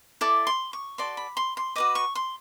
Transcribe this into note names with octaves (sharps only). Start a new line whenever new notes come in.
E4 A4 D5 D6
C6
C#6
F#4 A4 D5 C6
B5
C6
C6
F#4 B4 D#5 D6
C#6
C6